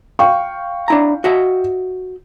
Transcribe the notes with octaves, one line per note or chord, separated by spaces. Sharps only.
F5 G5 C#6
D4 E4 A#5
F#4 D#5 E5